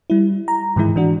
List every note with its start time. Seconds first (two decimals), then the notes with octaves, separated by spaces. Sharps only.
0.10 G3 E4
0.48 A#5
0.76 G#2 D#3 E3 G#3 E4
0.96 E3 D4 F#4